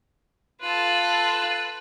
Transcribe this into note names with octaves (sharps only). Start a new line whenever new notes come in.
F4 A4 B4